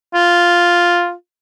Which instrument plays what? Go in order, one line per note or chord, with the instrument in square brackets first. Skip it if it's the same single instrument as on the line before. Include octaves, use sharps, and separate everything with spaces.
[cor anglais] F4